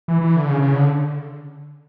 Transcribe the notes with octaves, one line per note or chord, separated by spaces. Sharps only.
E3
E3
D3
C#3
C#3
D3